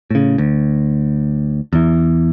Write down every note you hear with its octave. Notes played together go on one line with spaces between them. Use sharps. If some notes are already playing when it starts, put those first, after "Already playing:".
A2 C#3
D2
E2 E3